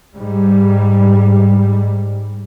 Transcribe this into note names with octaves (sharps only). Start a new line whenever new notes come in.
G#2 G3